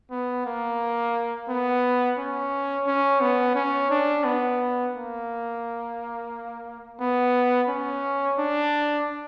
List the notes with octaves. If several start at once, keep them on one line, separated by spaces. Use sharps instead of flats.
B3
A#3
B3
C#4
C#4
B3
C#4
D4
B3
A#3
B3
C#4
D4